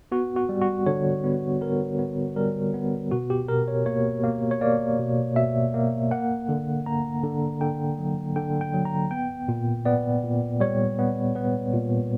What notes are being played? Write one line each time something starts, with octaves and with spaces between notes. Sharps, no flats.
B3 F#4
F#4
G3
F#4
D3 C#5
B3
B3 A#4
B3
G3 A#4
B3
B2 F#4
G4
B2 A#4
C#5
A#3 C#5
A#3
C#5
A#3 D5
B2
B2 E5
A#3
A#3 F#5
D3
A#3 A#5
D3
D3 G5
F#3
D3 G5
G5
F#3
A#5
B3 G5
A#2
B3 D5
A#2
G3 C#5
B3
B3 B4
A#2